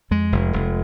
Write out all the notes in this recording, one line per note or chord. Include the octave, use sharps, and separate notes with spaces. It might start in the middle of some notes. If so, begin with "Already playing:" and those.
F2 G#3
F1
F1